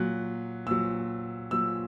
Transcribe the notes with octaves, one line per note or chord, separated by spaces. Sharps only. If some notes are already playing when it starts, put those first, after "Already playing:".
Already playing: A#2 F#3 F#6
A#2 F#3 E6
A#2 F#3 E6